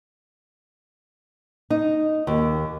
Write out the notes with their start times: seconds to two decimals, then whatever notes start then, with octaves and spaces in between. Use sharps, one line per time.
1.70 D#4
2.27 D#2